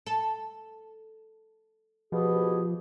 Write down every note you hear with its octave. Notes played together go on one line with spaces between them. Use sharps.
A4
B2 F3 B3 G4 G#4